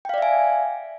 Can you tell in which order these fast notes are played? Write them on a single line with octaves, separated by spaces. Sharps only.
G5 F5 D5 E5 G#5